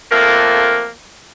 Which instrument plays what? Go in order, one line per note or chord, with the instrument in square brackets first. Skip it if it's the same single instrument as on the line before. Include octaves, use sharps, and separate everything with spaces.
[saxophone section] F2 A3 A#3